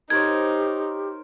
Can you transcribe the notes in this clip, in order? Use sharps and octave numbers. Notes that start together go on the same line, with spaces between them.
D#4 G4 A#4 C5 C#5 G#6